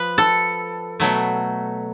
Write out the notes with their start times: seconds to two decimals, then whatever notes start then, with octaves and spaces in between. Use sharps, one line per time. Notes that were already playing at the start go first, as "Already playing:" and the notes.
Already playing: F3 B4
0.18 A4
1.00 B2 F#3 A3